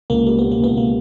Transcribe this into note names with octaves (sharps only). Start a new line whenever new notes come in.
C#2 A#3
G3 A#3
B2 B3
A#3
C#2 B3
C3 A#3